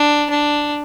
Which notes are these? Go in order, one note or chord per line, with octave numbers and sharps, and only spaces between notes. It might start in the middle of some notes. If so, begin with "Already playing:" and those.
Already playing: D4
D4